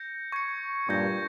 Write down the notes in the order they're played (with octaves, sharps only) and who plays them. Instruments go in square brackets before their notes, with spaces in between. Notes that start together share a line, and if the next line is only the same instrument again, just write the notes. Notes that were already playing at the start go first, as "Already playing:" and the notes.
Already playing: [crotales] G6 A#6 C#7
C#6 G#6 C#7
[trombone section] G2 A#2 [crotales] C#6 G6 A#6